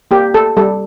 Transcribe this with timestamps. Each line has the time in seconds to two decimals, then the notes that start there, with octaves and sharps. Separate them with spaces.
0.11 A#3 G4
0.34 A4
0.57 G3 A4